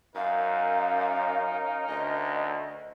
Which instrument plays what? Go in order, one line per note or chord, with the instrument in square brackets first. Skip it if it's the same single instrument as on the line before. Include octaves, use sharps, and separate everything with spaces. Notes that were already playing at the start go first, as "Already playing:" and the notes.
[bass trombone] F#2 [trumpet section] C#4 D#4 A#4 [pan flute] F5
[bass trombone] D2 [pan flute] D#5